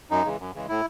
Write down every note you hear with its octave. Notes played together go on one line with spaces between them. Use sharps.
F#2 D#4
C#3 E3 G#3
F#2
C#3 E3 G#3
A2 E4